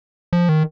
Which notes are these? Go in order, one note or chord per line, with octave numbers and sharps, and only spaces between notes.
F3
D#3